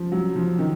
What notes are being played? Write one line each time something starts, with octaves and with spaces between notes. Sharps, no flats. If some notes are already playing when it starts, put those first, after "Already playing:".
Already playing: F3
F#3
F3
D#3